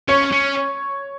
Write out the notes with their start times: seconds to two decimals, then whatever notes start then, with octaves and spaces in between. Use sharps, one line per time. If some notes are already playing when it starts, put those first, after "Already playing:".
0.08 C#4 C#5
0.32 C#4